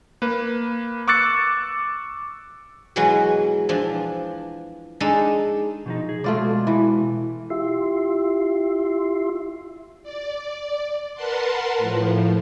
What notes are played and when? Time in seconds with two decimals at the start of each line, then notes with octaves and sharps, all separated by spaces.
0.22 A#3 B4
1.08 C#6 D6 E6 F#6 A6 C#7
2.96 B2 E3 F#3 G#3 F#4 B4
3.69 E3 F3 D4
5.00 G#3 D4 D#4 A4
5.86 B2 F3 D#4
6.09 G#4
6.24 B2 G#3 A3 F4 F#4 D5
6.67 E3
7.50 E4 F4 G4 E5 C6
10.03 D5
11.14 A#4 B4 F#5 A5 C6
11.78 A2 F3